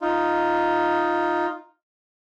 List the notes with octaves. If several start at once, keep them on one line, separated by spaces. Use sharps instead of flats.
D#4 F4